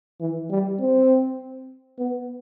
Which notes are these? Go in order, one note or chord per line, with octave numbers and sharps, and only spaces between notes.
E3
G3
C4
B3